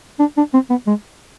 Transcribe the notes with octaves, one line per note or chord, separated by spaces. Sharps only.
D4
D4
C4
B3
G#3